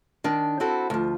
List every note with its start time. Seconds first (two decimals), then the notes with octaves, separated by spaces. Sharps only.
0.24 D#3 D4
0.60 C4 E4 F#4 A4
0.90 D2 F3